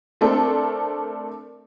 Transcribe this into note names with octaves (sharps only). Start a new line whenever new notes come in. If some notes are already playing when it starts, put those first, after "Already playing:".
A3 C4 D4 A4 A#4